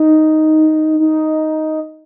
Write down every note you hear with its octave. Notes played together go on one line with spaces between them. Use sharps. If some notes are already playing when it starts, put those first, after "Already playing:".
Already playing: D#4
D#4